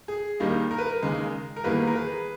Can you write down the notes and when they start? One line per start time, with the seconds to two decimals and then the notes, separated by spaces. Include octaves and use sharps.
0.08 G#4
0.40 D#2 D#3 G3 A#3
0.71 A#4
0.78 B4
0.86 A#4
1.02 D#2 C#3 G#3
1.56 A#4
1.64 E2 D#3 G3 A#3 G#4 B4
1.87 A#4
1.95 G#4 B4